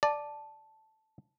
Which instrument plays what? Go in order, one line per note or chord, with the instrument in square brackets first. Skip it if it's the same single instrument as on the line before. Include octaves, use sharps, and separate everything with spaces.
[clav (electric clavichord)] D5 [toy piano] A5